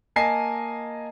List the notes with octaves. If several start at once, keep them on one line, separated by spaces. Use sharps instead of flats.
A#3 D#5 G#5 A5 C7